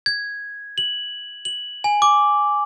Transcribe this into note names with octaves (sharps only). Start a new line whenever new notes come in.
G#6
F#7
F#7
G#5
D6